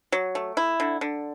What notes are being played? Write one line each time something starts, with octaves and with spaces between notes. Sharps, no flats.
F#3
A3
E4
D3
D3